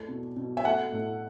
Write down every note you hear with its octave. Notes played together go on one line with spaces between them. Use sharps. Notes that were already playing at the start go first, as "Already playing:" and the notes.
Already playing: E2 A3
B2
B2
E5
A3 F#5
A2